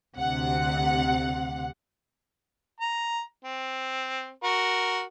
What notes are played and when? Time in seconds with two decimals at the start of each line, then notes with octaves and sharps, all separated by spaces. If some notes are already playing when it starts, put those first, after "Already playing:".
0.16 D2 C3 F#5
2.80 A#5
3.44 C4
4.43 F#4 A#4